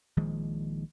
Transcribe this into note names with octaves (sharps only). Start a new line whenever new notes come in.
A#1 D#3 F3 G#3